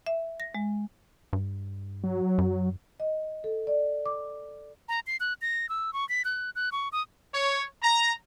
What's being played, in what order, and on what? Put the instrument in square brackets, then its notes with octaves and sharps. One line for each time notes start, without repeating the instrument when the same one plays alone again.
[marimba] E5
A#6
G#3
[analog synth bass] G2
[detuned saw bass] F#3
[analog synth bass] F#2
[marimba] D#5
A4
D5
D6
[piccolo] A#5
C7
F#6
A#6
E6
C#6
B6
F#6
F#6
C#6
D#6
[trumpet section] C#5
A#5